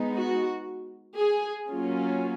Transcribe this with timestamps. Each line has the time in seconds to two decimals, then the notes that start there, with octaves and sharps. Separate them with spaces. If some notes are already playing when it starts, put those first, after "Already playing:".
Already playing: G#3 B3 D#4
0.15 F#4
1.17 G#4
1.68 F#3 A#3 C#4 F4